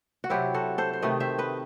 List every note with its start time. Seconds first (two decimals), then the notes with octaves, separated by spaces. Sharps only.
0.24 F#4
0.30 C3 F#3 C4 E4 G4
0.54 F#4 A4
0.78 A4 C5
0.93 C5
1.02 C3 D#3 A3 B4 D#5
1.20 C5 E5
1.38 B4 D#5